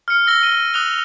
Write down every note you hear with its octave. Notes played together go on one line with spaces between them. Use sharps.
F6 C#7
E6 A#6 G7
D#7
D#6 E6 F#6 F7 G7